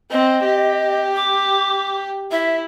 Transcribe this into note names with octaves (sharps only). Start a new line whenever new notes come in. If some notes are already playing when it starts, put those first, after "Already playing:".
C4 D#5
G4
D6
E4 E5